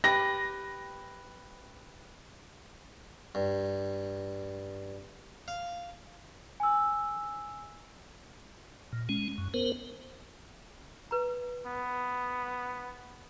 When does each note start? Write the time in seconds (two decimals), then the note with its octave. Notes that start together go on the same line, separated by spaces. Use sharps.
0.04 G4 B4 A#6
3.35 G2
5.48 F5
6.60 G#5 E6
8.93 A#2
9.09 G#3 C#4
9.38 F#2
9.54 B3 A#4 C5
11.11 B4 A#5
11.66 B3